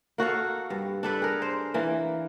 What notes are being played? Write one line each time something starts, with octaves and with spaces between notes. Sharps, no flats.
A#3 F#4 A4 F5
G2
D4 A4 B4
G#4 A#4
C5
E3 A#3